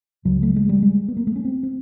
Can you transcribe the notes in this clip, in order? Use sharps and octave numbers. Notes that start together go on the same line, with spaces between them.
C#2 C#3 F#3
A3
G#3
G3
G#3
B3
A#3
A3
C#4
C4
C4